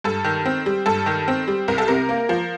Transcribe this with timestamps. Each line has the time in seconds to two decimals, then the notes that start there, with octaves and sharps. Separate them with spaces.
0.04 G2 A4
0.24 D#3
0.45 C4
0.66 G3
0.86 G2 A4
1.06 D#3
1.28 C4
1.48 G3
1.68 C2 A#4
1.78 A4
1.88 C3 A#4
2.09 A#3
2.29 F3